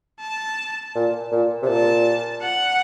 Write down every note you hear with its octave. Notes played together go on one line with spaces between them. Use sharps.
A5
A#2
A#2
C3
A#2 A5
F#5